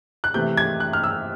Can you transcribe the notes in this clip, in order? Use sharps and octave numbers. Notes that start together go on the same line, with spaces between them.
F#6
C3 E3 A3 G6
G#6
F#6
F6
E6